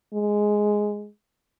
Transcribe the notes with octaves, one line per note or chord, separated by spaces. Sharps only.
G#3